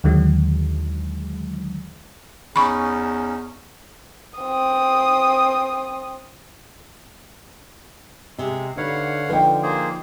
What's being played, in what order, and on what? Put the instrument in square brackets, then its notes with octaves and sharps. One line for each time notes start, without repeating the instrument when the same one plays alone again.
[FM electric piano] D#2 D3 D#3 F#3 G#3
[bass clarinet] E2 [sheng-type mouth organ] C#4 D#4 [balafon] B5 C#6
[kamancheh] C4 D#6
[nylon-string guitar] C3 [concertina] G#3
[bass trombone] D3 [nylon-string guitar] D#4 B4 [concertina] C#5 F5 F#5
[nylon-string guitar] F3 D#4 [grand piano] B4 D#5 G5
[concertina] A#3 G#4 C5